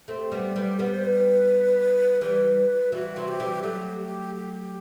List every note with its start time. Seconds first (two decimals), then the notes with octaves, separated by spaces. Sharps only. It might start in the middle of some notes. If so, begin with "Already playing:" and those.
0.08 A3 C4 G4
0.32 G3 B3
0.56 G3 B3
0.79 G3 B3 B4
0.92 C5
1.04 B4
2.21 E3 G3 B4
2.92 E3 G3 F#4
3.16 C3 E3
3.28 G4
3.40 E3 G3
3.63 F#3 A3 G4
3.99 G4
4.35 G4